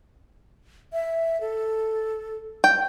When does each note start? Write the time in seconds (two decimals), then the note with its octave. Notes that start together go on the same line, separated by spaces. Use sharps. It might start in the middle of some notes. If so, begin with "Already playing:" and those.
0.93 E5
1.41 A4
2.64 G5